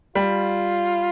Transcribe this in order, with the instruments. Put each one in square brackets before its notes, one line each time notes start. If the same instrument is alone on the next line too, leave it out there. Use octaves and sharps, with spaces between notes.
[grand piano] G3 [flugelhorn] F4